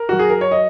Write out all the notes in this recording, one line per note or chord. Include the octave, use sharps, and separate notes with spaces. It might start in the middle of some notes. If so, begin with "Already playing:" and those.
Already playing: A#4
F#3 F#4
G#4
A#4
C#5
D#5